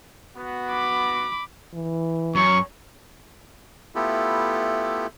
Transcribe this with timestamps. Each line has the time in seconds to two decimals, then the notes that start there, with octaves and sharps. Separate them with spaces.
0.37 B3 F#4
0.70 B5 D6
1.74 E3
2.35 F#2 C#6
3.95 A3 B3 E4 F4 G4 A4